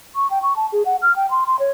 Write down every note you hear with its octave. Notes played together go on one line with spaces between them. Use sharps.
C#6
G5
C#6
A5
G#4
F#5
F6
G5
C6
C6
C#5